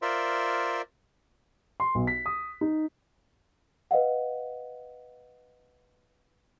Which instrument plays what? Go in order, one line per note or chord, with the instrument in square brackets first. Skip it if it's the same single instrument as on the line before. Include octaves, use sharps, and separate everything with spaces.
[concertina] F4 A#4 C5 D5 E5
[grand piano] C6
B1
B6
D#6
D#4
[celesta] B4 D#5 F5 F#5